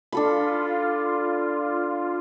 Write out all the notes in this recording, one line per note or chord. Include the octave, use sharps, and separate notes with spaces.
D4 F4 A4 B5